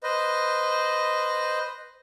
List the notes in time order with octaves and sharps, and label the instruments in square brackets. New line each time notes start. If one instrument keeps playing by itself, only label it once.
[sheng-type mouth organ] B4 C5 D#5